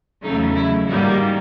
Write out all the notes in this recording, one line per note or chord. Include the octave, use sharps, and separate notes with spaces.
E2 C#3 F#3 A3 D#4
E4
G#2 D#3 G3 A#3 F#4